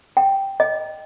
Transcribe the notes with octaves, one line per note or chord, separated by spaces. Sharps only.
G5
D#5